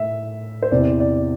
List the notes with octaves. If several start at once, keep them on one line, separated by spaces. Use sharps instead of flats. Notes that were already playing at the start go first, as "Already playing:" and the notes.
Already playing: A2 E5
C5
E2 C3 E3 D5
D5